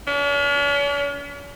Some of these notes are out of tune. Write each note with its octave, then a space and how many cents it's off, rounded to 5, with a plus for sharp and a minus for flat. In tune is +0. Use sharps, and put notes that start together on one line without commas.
C#4 +45